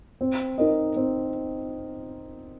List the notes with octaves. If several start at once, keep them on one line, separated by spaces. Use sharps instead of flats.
C4
D#4 A#4 D#5
C4